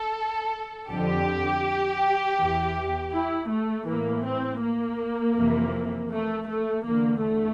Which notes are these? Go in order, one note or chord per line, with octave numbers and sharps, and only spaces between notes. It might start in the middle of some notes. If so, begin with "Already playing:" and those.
Already playing: A4
F2 D3 G4
E2 E3
E4
A3
A2 E3 A#3
C4
A#3
F2 C3 E3
A3
A3
E2 D3 A#3
A3